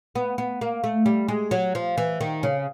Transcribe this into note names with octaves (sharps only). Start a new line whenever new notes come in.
B3
B3
A#3
A3
G3
G#3
F#3
F3
E3
D#3
C#3